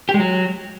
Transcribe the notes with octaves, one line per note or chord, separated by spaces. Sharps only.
G4
G#3
F#3